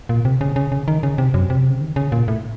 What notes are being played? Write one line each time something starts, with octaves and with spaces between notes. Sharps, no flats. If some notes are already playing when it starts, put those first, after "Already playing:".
A#2
C3
C#3
C#3
C#3
D#3
C#3
C3
F#2
C3
C#3
D#3
C#3
A#2
A2